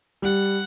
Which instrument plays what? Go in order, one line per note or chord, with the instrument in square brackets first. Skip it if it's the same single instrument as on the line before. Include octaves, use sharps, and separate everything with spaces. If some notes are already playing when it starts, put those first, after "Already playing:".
[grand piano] G3 [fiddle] F#5